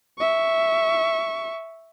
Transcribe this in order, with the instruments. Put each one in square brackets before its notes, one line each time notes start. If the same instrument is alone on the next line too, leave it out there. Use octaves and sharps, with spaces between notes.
[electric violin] E5 C#6